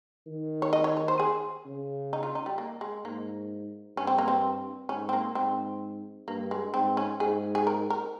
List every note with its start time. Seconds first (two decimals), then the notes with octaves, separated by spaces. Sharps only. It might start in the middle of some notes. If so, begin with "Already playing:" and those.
0.27 D#3
0.62 C#5
0.73 D#5
0.84 C#5
0.97 C#5
1.08 C5
1.20 G#4
1.65 C#3
2.13 D#4
2.23 F4
2.35 D#4
2.46 G3
2.58 A#3
2.81 G#3
3.04 G#2 A#3
3.97 G2 C#4
4.07 C4
4.18 A#3
4.28 C4
4.89 G#2 C#4
5.09 C4
5.13 A#3
5.35 G#2 C4
6.28 G2 A#3
6.51 G#3
6.74 G#2 C4
6.97 C#4
7.20 G#2 G#4
7.55 G#4
7.67 A#4
7.90 A#4